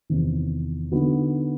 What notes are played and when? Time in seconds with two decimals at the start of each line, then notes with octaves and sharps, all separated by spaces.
0.10 E2 C3 D#3
0.91 D3 F#3 B3 D#4 F#4